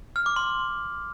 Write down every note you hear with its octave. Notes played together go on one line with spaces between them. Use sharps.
F6
D6
C6